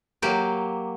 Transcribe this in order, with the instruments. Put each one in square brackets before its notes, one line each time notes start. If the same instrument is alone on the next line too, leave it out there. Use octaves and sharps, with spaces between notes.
[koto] F#3 A#3 G4